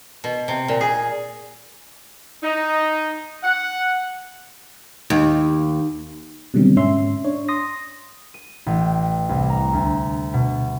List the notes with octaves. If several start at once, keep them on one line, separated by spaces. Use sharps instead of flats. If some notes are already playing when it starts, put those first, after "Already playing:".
B2
C3
A#2
G#4
D#4
F#5
D#2
B2 D3 D#3 F#3 G3 C4
G#2 C#4 E5 C6
D4 C#5
C6 D#6 A#6
D#7
A1
G5
C2
A#5
D2
B2